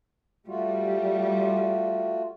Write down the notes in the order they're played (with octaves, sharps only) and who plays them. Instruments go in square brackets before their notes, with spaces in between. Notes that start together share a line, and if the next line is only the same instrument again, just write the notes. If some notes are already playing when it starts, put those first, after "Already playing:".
[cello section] G3 [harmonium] A3 F4 F#4